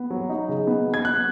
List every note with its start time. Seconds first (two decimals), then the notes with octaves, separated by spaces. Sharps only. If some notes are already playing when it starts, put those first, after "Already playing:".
Already playing: B3
0.10 F#3
0.29 D#4
0.48 C#3
0.67 B3
0.86 F#3
0.94 G#6
1.05 B3 F#6